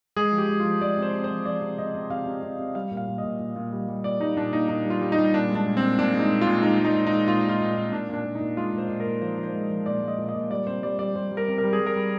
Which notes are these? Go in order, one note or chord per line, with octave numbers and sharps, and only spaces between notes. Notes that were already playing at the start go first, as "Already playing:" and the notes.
G#3 G#4
F3
G4
G#3
F3 F4
G#3 D5
C3
C5
C3
C5
F3
F3 D5
C3
C3 D#5
C3
C3 F5
C3
C3
C3
G3 F5
A#2
F5
A#2
D#5
A#2
A#2
A#2
G3
G3
A#2 D5
G3 D#4
A#2 D4
A#2 D#4
A#2 D#4
G3
F4
G3
D#4
G3
A#2 D4
G#3
D4
A#2
A#2 C4
A#2 D4
G#3
D#4
A#2
F4
A#2
G#3 D#4
G#3
D#4
A#2
G#3 D#4
A#2 F4
A#2
F4
A#2
A#2
A#2 D4
A#2 D4
A#2
D#4
A#2
G#3 F4
A#2
C5
A#2
A#4
A#2
F3 C5
F3
C5
G#3
F3
A#2 D5
G#3
D#5
A#2
D#5
A#2
G3 D5
C3 C5
G3 D5
G3 D5
G3 C5
G3
A#4
C3
A#4
G3
G#4
G3
A#4
G3